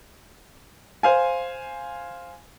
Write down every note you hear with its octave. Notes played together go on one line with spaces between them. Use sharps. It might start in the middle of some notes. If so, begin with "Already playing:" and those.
C5 F5 G#5